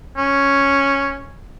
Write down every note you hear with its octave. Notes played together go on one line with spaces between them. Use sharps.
C#4